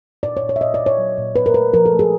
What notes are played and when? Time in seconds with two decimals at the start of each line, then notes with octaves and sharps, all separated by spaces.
0.23 A#2 D5
0.37 C#5
0.43 A#2
0.49 C#5
0.56 E5
0.61 A#2 D#5
0.74 D5
0.80 A#2
0.86 C#5
0.98 F#3
1.18 A#2
1.36 A#2 B4
1.46 A#4
1.54 A3 B4
1.73 F3 A#4
1.86 A4
1.92 A3
1.99 G#4